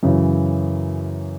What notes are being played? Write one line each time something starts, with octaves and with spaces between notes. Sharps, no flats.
F#2 C#3 E3